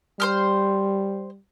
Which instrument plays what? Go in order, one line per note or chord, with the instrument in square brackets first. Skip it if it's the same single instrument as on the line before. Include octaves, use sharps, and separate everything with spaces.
[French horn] G3 [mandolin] C5 C6 F6